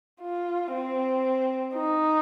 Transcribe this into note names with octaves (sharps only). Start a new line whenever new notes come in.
F4
C4
D#4